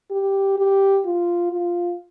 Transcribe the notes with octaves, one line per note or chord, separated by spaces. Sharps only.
G4
G4
F4
F4